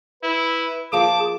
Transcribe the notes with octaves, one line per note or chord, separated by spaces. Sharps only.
E4 B4
F3 A#3 F4 G#4 A5 D6